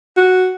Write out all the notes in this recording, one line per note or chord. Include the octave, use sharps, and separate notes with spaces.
F#4